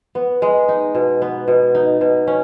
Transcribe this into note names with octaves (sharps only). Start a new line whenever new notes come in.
B3
G#3
D#4
B2
B3
B2
D#4
B2
C#4